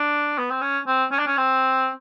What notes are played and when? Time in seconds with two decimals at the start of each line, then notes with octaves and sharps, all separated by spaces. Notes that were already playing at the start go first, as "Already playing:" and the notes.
Already playing: D4
0.38 B3
0.51 C4
0.61 C#4
0.87 C4
1.12 C#4
1.19 D4
1.27 C#4
1.37 C4